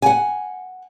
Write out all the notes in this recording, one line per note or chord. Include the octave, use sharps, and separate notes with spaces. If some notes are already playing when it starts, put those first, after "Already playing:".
F#5 G#5